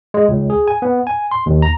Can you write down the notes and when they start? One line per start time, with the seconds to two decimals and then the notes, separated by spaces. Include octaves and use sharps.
0.14 G#3
0.29 C#2
0.50 G#4
0.68 G#5
0.82 B3
1.07 G#5
1.31 C6
1.46 D#2
1.62 A#5